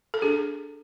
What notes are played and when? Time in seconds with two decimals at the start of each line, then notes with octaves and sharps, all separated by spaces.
0.14 A4
0.22 D4 G#4